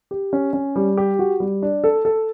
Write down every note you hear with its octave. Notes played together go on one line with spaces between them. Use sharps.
G4
C#4
C#4
G3
G4
F#4
G3
D4
A4
A4